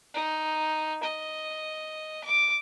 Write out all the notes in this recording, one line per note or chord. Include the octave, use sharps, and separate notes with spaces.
D#4
D#5
D6